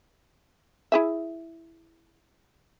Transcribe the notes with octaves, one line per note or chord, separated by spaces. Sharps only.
E4 G#4 E5